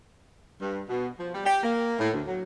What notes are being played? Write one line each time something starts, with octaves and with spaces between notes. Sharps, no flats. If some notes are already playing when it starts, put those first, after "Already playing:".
G2
B2
F3
G3
G4
A#3
A2
D2
F#3